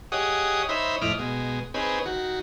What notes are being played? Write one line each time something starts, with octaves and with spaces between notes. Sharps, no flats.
G4 G#4 C#5 D#5 F#5 D#6
D#4 C5 C#5 E5 B5
F2 A2 E4 D#5 D6 F6
B2 G#3
C4 D#4 G#4 B4 C#5
D#3 F#4